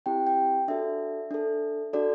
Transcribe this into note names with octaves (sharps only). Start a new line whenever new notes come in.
C4 E4 G4 G5
G5
D4 F#4 A4 E5
D4 A4
D4 F#4 A4 D5